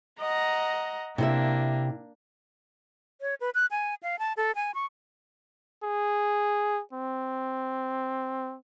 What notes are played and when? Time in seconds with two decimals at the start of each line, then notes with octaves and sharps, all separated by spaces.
0.19 D#5 F#5 A#5
1.18 C3 A#3 D4 E4 E5
3.21 C#5
3.41 B4
3.55 F#6
3.71 G#5
4.03 F5
4.19 A5
4.37 A4
4.55 G#5
4.75 C#6
5.83 G#4
6.93 C4